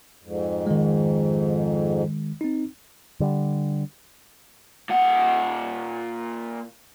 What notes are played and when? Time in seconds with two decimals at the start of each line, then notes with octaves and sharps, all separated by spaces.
0.23 F2 G#2
0.67 D#3 G#3
2.41 C4 D#4
3.20 D3 G3
4.89 A#2 F#5